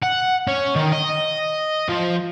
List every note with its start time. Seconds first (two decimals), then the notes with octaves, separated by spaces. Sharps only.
0.03 F#5
0.47 C#4
0.76 D#3
0.93 D#5
1.89 F3